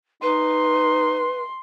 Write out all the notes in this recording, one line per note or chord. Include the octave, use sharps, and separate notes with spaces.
D#4 B4 C6